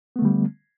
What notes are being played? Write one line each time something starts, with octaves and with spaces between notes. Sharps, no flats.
D3 G3 A3 B3